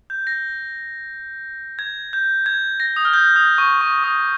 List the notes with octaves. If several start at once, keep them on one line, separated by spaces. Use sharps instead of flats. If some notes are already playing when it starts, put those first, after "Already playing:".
G6
A#6
G#6
G6
G#6
A#6
D#6
F6
G6
D#6
C#6
C#6
D#6